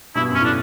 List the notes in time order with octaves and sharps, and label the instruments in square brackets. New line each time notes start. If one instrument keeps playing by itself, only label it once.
[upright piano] G2 B2 [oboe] E4
[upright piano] F#2
[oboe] C#4
[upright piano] A2 [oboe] D4